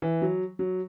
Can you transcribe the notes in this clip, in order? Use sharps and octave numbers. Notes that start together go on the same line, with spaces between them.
E3
F#3
F#3